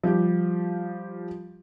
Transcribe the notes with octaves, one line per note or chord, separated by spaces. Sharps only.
F3 G3 G4